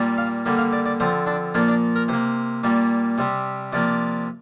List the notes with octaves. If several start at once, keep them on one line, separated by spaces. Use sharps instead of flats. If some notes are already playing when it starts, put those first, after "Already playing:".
Already playing: A#2 G3 A#3
F5
D3 G3 A#3
F5
D5
D5
D3 F3 C4 C5
D4
A#2 F3 A#3 D4
D4
A#4
C3 A#3 C5
A#2 G3 A#3
C3 G3 C4
C3 F3 A#3 D5